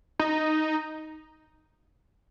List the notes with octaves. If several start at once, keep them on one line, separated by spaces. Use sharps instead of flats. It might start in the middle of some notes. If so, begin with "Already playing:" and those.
D#4